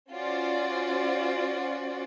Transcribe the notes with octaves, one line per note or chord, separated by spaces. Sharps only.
C#4 F4 F#4 C5 D5